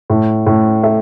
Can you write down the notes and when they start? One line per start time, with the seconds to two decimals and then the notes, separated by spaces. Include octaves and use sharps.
0.10 A2
0.46 A2
0.83 A3 E5